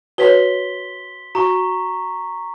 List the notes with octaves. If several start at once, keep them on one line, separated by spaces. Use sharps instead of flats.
F#4 B4 C#5 C6 B6 G7
F#4 A#5 C#6